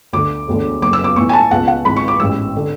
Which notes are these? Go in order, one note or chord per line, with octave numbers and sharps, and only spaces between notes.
D2 D3 D6
E1 D2 D3
F#1 E2 B2 D6
E6
D6
B1 A2 E3 C#6
G#5
A5
C#2 B2 F#5
F#5
G#1 G#2 E3 B5
C#6
D6
A1 G#2 E3 E6
D3